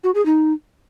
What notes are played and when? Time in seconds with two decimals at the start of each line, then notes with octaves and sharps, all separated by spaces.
0.04 F#4
0.15 G#4
0.26 D#4